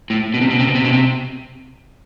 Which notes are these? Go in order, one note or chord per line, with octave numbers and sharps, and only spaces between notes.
A2
B2
C3
B2
C3
B2
C3
B2
C3